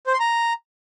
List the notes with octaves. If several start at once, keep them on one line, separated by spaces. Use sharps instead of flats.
C5
C6
A#5